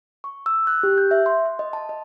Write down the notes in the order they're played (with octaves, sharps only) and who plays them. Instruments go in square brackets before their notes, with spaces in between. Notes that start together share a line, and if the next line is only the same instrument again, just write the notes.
[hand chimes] C#6
E6
F#6
G4
G6
E5
C6
C6
D#5
A5
D#5